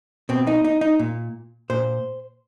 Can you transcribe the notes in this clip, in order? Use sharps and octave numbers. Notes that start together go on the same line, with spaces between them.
B2 C4
D#4
D#4
D#4
A#2
A#2 C5